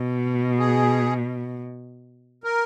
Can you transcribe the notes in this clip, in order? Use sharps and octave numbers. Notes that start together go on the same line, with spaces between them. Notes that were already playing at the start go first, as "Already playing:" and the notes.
Already playing: B2
G#4
A#4